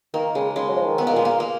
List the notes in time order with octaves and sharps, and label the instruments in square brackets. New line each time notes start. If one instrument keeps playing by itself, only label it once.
[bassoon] D#3 [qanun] A#3
[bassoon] C#3 [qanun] G#3
[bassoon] C#3 [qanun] G#3
[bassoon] F#3
F3
D#3
[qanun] B3
A#3
[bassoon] A#2 [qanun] G#3
[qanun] A#3
A#3